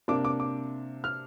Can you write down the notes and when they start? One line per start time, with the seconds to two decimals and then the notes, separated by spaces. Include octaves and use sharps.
0.08 C3 A#3 D4 D6
0.25 D6
0.40 D6
1.04 F6